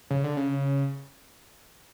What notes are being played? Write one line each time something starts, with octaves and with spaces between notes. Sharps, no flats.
C#3
D3
C#3